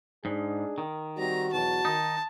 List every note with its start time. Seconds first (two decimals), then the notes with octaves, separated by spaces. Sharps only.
0.25 G#2 D4 D#4 G#4
0.78 D#3
1.18 G3 C4 D#4 F#4 A#5
1.53 E2 B2 F#3 A5
1.85 D#3 D#4